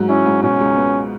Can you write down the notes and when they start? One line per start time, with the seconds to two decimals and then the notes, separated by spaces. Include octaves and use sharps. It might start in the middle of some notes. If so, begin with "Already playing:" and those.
Already playing: G#2 F#3
0.09 C#4 E4
0.26 G#2
0.43 B2 C#4
0.60 C#2
0.77 B3